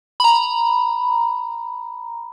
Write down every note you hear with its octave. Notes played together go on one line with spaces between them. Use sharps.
A#5 B5